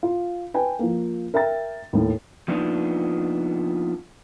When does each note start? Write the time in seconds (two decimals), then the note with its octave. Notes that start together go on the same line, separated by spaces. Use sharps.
0.03 F4
0.54 B4 G5 G#5
0.79 F3 A#3
1.34 A#4 E5 G5 A#5 A6
1.93 D#2 A2
2.48 F3 A#3 B3 D4 D#4 F4